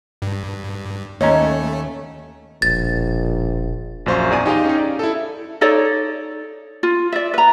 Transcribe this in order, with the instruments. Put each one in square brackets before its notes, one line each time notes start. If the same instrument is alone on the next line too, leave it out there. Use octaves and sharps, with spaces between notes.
[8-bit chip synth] G2
[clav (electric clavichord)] D#2 C#4 [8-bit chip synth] A3 [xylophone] C#5 D#5 A#5
[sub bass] E1 [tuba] A#1 [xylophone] A6
[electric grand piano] A#1 F#2 C5 F5 C#6
E2 G#4 D5 G#5 D#7
D#4 G4 G#4 D#5 F5
C#4 D#4
D5
E4 A4
[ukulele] D#4 A4 C#5 D5
F4
D5 E5
B4 A#5